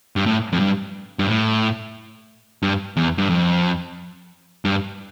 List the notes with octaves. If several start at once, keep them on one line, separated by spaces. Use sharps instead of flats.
G2
A2
F2
G2
G2
A2
G2
E2
G2
F2
G2